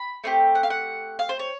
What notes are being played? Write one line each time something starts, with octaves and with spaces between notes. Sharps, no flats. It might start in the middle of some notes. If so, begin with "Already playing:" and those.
Already playing: B5
A3 C4 D#4 G4
F#5
F5
F#5
F5
C5
C#5